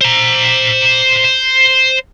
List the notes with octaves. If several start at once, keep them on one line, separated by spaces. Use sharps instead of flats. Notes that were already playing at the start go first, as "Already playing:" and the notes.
C5 A#5